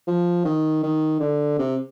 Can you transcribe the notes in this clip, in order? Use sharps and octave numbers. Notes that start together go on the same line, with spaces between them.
F3
D#3
D#3
D3
C3